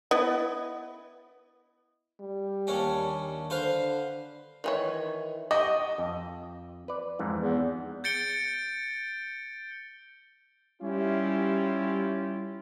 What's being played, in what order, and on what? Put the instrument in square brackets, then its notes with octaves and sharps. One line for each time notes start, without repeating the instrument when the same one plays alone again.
[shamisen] B3 E4 D#5
[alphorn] G3
[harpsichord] D#2 C#4 D4
[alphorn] D3 [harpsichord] B4 C5 F5
[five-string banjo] D#3 E3 C#5
[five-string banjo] F#4 G4 [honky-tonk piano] D#5
[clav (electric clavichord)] F2
B4 D5
F2 G#2 E3
[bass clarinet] E2
[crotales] G6 A6 C#7 D7 G7
[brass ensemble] G3 C#4 E4 F4 G4